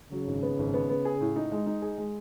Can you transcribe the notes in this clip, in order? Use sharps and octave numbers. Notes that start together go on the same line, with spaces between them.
C#3 F#3
G#1
B3
G#1
B3
B3
G#4
A2
D#4
G#3
D#4
G#4
G#3